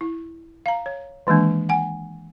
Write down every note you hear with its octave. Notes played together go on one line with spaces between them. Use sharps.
E4
F5 A#5
C#5
D#3 E3 G#3 A#3 D4
F#5 G#5